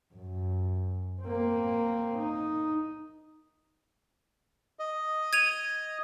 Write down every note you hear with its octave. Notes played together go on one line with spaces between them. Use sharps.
F#2
A#3 C4
D#4
D#5
G#6 D#7 F7